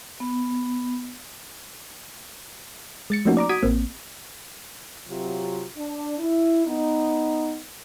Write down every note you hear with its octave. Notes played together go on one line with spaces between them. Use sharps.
B3
G#3 A6 C#7
F3 A3 A#3 C#4 D#4 F#4
D5 A#5 D6
F#4 D#6 G#6 B6 D7 D#7
A1 A#3 C4
C3 F#3 F4
D4
E4
B3 D#4